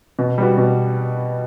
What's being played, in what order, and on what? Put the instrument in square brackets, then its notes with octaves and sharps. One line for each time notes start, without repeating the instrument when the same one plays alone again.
[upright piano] B2
G3 B3 F#4
B2